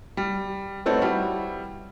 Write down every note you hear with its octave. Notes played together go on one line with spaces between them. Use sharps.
G3
A3 B3 C4 D#4 A4 C#5
G3 E4 F#4